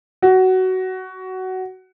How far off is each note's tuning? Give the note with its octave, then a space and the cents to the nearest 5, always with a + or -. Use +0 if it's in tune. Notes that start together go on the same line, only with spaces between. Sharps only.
F#4 +15